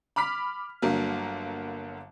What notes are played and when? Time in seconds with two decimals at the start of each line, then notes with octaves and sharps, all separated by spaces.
0.16 B5 D6 F6 B6
0.82 G1 D3 F#3 A#3